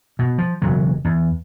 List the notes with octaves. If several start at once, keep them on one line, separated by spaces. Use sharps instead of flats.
B2
F3
E1 C#3 F#3
E2